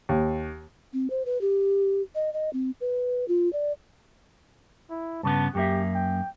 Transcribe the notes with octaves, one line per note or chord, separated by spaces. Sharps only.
D#2
C4
C5
B4
G4
D#5
D#5
C4
B4
F4
D5
E4
G2 C#3 B3 A5
F#2 A#3 G4 E5
G5